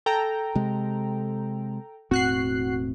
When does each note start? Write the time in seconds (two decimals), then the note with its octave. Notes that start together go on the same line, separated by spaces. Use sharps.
0.06 A4 G5 A#5
0.55 C3 G#3
2.11 E1 A2 C4 F#4 F#6 C7